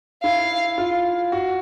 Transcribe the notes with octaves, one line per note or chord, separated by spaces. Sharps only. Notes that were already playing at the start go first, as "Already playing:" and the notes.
E4 F5
F4
F#4